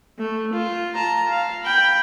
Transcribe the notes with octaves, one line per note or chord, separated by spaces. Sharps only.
A3
F4
A5 A#5
F5
G5 B5